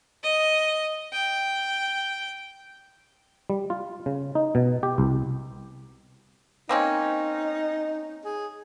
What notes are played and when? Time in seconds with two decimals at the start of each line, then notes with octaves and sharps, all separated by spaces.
0.23 D#5
1.12 G5
3.50 G3
3.70 F4
4.06 C#3
4.35 D#4
4.55 B2
4.83 G4
4.98 C2
6.69 A#3 C4 C#4 D#4
8.25 G#4